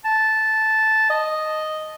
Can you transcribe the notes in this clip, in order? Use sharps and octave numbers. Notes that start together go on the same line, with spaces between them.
A5
D#5